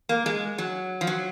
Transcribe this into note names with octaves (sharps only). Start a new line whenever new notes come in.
A#3
G#3
F#3
F3
F#3